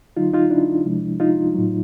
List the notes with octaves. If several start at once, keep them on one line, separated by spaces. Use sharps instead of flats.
D3 F#3 D#4 F4
D#4 F4
D4 E4
C3 F3 G#3
D#4 F4
A2 F#3